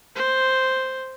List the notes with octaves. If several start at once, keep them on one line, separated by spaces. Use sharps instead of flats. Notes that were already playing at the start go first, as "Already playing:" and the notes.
C5